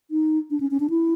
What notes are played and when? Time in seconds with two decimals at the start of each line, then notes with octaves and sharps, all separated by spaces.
0.11 D#4
0.50 D4
0.60 C#4
0.71 C#4
0.80 D4
0.90 E4